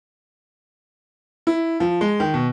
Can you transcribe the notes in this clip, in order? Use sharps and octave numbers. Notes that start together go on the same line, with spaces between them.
E4
F3
G#3
D#3
B2